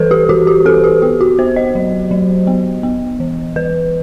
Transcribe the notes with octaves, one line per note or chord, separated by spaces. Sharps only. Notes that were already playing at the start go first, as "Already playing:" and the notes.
Already playing: E3 G3 A4 B4 C5
G4
E3 F#4
G4
C4 A4
G4
B3 G4
F#4
B3 C5
D#5
F#3
F#3
B3
B3
E3
E3 B4